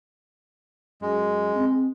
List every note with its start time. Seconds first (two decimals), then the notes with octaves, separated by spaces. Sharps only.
1.02 F#2 G#3
1.56 C4